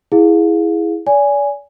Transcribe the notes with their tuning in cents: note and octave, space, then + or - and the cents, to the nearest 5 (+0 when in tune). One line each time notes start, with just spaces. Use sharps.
E4 +0 G#4 +0 F5 +25
D5 -35 G#5 -5